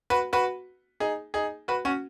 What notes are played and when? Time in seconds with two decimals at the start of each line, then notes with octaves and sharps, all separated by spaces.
0.10 F#4 B4
0.33 F#4 B4
1.00 D#4 G#4
1.34 D#4 G#4
1.68 F#4 B4
1.85 C#4 F#4